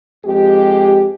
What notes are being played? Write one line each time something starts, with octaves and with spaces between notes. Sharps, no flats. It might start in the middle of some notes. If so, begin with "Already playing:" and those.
F2 G#3 G4